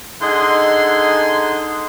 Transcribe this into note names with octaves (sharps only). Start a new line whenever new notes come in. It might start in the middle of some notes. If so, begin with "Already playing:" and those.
D3 D#4 G#4 D#5 F#5 C6